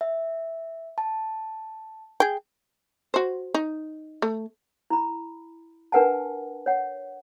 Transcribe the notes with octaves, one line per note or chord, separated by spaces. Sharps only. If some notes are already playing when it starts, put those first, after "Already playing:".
E5
A5
G#4 G5
F#4 C5
D#4
A3
E4 B5
D4 A#4 B4 F#5 G#5 A5
C#5 F#5